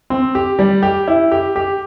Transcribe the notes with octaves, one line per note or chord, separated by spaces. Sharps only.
C4
G4
G3
G4
E4
G4
G4